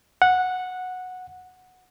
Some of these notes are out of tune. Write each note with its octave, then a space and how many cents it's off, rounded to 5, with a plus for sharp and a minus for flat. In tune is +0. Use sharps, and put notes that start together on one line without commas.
F#5 -10